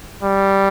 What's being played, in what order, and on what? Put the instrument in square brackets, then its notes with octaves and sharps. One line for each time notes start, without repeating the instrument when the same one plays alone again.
[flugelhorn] G3